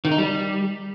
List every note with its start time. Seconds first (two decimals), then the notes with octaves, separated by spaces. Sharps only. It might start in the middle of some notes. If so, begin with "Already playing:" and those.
0.05 D#3
0.11 D#4
0.18 G3